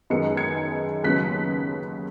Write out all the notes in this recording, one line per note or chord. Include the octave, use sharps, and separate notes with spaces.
F#2 D#3 G#3 B3 C#7
G#6 C#7
D#2 C#3 F#3 B3 F#6 B6